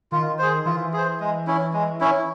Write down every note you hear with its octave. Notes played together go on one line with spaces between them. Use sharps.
D#3 F4
G#4 C5
E3 F4
G#4 C5
G#3
C#4 E4
G#3
C#4 E4